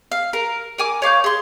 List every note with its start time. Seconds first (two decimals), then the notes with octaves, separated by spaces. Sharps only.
0.12 F5
0.33 A#4
0.78 A#4 G#5 D6
1.02 C#5 F5 D6 G6
1.24 G#4 C6